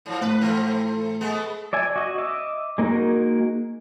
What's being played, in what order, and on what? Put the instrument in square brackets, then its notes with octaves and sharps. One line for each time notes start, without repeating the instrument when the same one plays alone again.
[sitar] G#2 F3
[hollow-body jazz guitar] A2 [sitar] B4
[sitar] E3 A3 C4
G#3 A3 B3
[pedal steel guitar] D5 E5 G#5
F#4 D#5
D#5 E5 D6
G#3 A#3 D#4 F#4 A#4